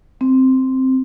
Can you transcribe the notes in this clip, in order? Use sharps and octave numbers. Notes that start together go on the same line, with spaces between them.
C4